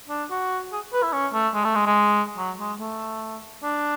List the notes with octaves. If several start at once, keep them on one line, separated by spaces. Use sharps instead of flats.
D4
F#4
G#4
B4
E4
C#4
A3
G#3
A3
G#3
G#3
F#3
G#3
A3
D4